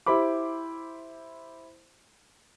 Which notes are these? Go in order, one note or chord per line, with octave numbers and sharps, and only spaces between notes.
E4 G4 C5 B5 D6